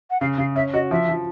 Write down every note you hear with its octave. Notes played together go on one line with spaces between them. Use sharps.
F#5
C#3 F5
C#3 F5
C#4 E5
F#4 D#5
F3 E5
F3